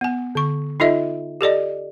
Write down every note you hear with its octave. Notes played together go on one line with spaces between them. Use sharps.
B3 G#5
D3 C#6
D#4 F4 A4 D#5 E5
G4 A4 D5 D#5